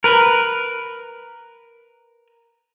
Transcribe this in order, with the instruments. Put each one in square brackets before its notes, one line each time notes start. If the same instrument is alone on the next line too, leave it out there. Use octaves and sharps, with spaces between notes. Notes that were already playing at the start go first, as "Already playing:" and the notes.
[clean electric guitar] A#4 B4